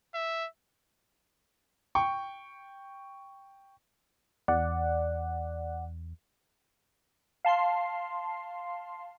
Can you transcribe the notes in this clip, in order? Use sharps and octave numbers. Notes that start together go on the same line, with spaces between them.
E5
G5 C#6
E2 D5 F#5
F5 A5 C6 C7